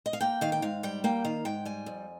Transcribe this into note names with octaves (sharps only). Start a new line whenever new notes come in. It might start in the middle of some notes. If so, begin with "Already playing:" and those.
D#5
F5
A#3 G5
D#3 F5
G5
G#2 F5
G3 G5
A#3 G5
D#3 F5
G#2 G5
G3 G#5
F2